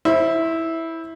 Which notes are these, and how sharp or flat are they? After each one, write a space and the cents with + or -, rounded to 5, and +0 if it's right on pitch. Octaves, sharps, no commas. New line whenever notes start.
E4 -10 C5 +20